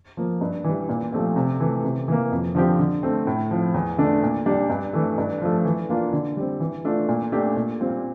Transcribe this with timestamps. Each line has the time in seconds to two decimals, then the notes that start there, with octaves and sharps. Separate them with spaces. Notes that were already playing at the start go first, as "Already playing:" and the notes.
0.17 F3 A#3
0.41 G2
0.64 E3 G3
0.89 A#2
1.12 F3 A3 C4 G4
1.36 C3
1.60 E3 A3
1.84 C3
2.08 E3 A#3
2.32 F2
2.55 D3 F3 C4 G4
2.79 D3
3.03 A3 C4
3.27 A2
3.51 F3 C4
3.74 E2
3.98 D3 A3 D4
4.23 A#2
4.46 G3 D4 G4
4.70 G2
4.93 E3 A3
5.18 G2
5.42 F3 A3
5.65 E3
5.89 A#3 D4 F4
6.13 D3
6.37 G3 C4
6.60 E3
6.85 A3 D4 F4
7.09 A#2
7.32 A3 D4 G4
7.56 A#2
7.80 G3 C4 F4